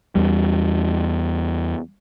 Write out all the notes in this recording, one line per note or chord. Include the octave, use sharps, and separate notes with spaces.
E2 G3